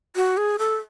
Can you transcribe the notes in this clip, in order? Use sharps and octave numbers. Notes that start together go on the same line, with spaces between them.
F#4
G#4
A4